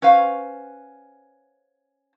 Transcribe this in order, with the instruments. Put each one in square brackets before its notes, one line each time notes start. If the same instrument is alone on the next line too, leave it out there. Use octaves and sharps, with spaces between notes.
[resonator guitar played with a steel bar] C#4 B4 C5 F5